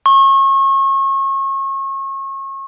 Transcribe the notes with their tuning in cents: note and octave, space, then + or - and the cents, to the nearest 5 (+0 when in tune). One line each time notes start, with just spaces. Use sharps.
C#6 -35